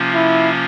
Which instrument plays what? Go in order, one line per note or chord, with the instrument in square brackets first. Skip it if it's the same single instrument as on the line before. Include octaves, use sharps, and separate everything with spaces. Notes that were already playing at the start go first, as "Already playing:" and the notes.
Already playing: [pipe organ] C3 F3 A#3 C#4 F4
[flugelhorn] E4